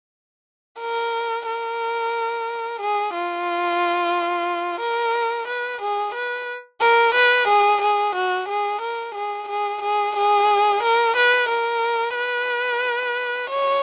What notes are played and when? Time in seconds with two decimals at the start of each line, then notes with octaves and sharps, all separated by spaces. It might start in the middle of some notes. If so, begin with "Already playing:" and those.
0.80 A#4
1.46 A#4
2.81 G#4
3.14 F4
4.81 A#4
5.48 B4
5.81 G#4
6.14 B4
6.81 A#4
7.15 B4
7.48 G#4
7.82 G#4
8.15 F#4
8.49 G#4
8.81 A#4
9.15 G#4
9.49 G#4
9.82 G#4
10.16 G#4
10.83 A#4
11.17 B4
11.49 A#4
12.16 B4
13.50 C#5